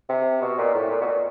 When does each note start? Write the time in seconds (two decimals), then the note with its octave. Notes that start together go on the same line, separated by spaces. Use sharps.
0.09 C3
0.42 B2
0.58 A#2
0.74 A2
0.90 A#2
1.01 B2
1.06 A#2